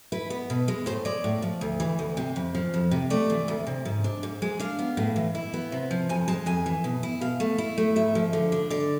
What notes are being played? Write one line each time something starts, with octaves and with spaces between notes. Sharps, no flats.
E4 B4
B3
B2
G#3
A2 C5
G#3 D5
A2
F3
D2
E3
D2
C3
F2
F3
F2
C3
A3 D5
E3
D2
C3
G#2
D4
G#2
G#3
D4 F5
B3
A2
E3
E4
B3
C3
F3
F2 G#5
G#3 A5
F2 G#5
E3
B2
E4
B2 F5
A3
E4
A3
G#2 E5
F3
D3
D4
D3 D5